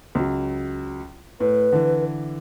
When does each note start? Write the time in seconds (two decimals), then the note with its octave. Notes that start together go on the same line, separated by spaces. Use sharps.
0.15 C#2 F#3
1.40 A2 B4
1.72 D3 E3